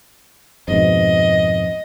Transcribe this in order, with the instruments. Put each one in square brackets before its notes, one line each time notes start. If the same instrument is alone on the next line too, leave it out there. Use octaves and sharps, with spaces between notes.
[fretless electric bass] F2 G#2 B2 [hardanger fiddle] D#5